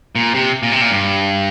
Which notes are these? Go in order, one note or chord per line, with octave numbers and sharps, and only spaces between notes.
A#2
C3
A#2
C3
A#2
G2